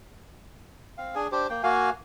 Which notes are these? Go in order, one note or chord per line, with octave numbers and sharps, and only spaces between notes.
C4 F5
D4 G#4 G#5
D4 G4 C5
A#3 G5
A#3 F#4 F5 G#5